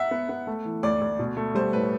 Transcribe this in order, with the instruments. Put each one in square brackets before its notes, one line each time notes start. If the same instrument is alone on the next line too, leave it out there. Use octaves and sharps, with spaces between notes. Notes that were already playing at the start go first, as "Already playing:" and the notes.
Already playing: [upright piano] E5 F#5
[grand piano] B3
B3
A3
E3
[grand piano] D2 [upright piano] D5
[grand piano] D2
B2
A3
[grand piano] G3 [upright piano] C5
[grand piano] A2 [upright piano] B4